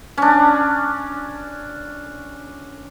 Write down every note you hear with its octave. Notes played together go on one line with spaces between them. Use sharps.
C#4 D4